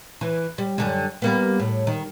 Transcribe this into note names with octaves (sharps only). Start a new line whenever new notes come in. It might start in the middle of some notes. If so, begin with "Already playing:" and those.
E3
G3
F#2 D3 G3
G3 A#3 B3
A2
D#3